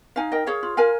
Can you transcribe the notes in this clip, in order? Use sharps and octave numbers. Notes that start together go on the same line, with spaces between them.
D#4 F5 G#5
A#4 D#5 G5
G#4 C#5 F5
F4
A#4 F5 G#5